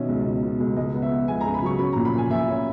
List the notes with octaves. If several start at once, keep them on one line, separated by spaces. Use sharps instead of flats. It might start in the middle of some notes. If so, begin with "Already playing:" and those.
Already playing: B2 D#3 C#4 E5
C#2
B2
B2
C#2
C#2 D#5
B3
E5
B3
C#2 G#5
A#5
C#3
B5
F#3 C#6
C#4 B5
A#5
A#2
B5
A#2 G#5
A#2 E5
C#4